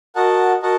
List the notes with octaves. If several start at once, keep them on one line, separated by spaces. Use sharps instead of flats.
F#4 A#4 D#5 F#5 A5
F#4 A#4 D#5 F#5 A5